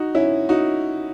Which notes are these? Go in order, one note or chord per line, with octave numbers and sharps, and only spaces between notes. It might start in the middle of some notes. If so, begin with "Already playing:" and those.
Already playing: D#4 F#4
C#4 E4
D#4 F#4